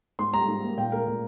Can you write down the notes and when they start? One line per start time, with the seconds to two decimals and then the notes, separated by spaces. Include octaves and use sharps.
0.19 G#2 C6
0.34 G3 A#5
0.48 G#2
0.63 A#3
0.77 A#2 G5
0.92 G#3 A#4
1.07 A#2